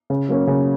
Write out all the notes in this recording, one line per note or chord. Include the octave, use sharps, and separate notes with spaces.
C#3
F#3 A#3 C#4
C#3